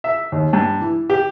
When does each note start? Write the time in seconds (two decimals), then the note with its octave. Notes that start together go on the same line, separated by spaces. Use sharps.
0.04 E5
0.32 D#2
0.53 G2
0.81 E3
1.10 G4